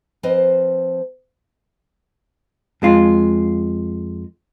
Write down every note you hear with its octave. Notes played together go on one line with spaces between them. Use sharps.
F3 C4 B4 C5 D#5
F2 G#3 F4